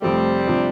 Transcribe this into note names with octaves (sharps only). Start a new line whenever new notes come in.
F1 F2 F3 G3 A3 C4
C3 F3 D4